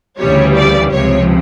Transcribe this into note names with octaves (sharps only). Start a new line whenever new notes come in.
D2 C#3 E3 G3 C#5
D5
C#2 C3 F3 C#5